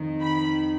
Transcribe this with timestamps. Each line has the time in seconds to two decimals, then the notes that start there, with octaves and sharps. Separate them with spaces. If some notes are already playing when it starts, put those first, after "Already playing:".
Already playing: F2 D#3
0.22 B5